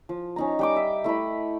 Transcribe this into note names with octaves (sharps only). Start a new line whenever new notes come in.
F3
C#4 D#4 A#5
G3 G5 D6
E5
A3 E4 D#5 B5